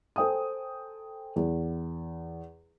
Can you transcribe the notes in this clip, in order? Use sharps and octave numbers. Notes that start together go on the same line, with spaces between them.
A4 C5 G5 G#5 D#6
E2